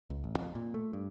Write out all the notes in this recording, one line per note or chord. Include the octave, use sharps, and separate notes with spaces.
C#2
A1
F2
A#2
A3
G2